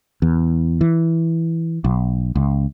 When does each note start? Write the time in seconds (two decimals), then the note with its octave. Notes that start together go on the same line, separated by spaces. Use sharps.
0.22 E2
0.81 E3
1.84 B1
2.36 C#2